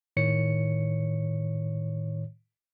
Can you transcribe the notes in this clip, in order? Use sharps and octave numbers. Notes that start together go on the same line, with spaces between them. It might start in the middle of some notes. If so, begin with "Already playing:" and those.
A2 D#3 C#5 C#7